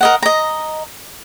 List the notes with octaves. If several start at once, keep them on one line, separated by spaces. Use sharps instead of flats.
A#4 D#5 F#5
D#5 A#5